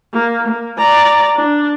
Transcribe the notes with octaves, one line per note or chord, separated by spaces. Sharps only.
A#3
A#3
D5 A#5
D4